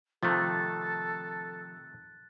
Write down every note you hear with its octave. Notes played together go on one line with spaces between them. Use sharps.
C3 D#3 F3 A3 A4 F#6 A6